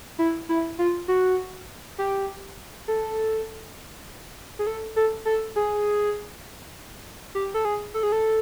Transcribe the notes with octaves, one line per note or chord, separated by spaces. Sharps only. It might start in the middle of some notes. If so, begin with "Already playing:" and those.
E4
E4
F4
F#4
G4
A4
G#4
A4
A4
A4
G#4
G4
A4
G#4
A4
G#4
A4